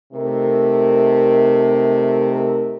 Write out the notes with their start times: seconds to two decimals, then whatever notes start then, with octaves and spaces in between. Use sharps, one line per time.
0.13 C3 A3 D#4 A#4